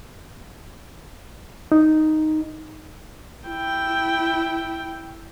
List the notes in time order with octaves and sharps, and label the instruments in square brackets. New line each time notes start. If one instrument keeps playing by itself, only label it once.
[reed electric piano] D#4
[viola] E4 G5